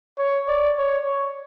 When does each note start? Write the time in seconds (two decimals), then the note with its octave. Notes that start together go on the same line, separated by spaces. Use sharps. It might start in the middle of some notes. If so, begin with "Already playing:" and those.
0.18 C#5
0.48 D5
0.78 C#5